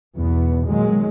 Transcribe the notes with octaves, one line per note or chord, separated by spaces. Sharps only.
B1 E2 B3
A#2 D#3 F#3 G#3